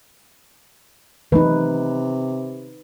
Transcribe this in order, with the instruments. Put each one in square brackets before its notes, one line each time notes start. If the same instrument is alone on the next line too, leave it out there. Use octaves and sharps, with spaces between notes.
[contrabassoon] C3 [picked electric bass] E3 F#3 A3 [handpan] D#4 B4